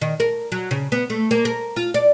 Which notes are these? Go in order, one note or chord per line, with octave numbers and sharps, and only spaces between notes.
D#3
A#4
F#3
C#3
B3
A3
A#3
A#4
F4
D5